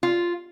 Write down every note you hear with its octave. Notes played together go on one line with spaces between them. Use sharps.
F4